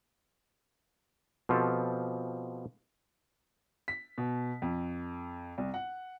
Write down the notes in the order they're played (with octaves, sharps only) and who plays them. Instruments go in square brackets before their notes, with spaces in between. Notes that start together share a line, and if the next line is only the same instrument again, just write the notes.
[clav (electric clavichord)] B2 F3 C4 F4 G4 A4
[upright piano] B6
B2
F2
C2
F#5